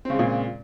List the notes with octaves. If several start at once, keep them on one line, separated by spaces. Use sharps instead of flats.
A#2 C#3 G#3 C4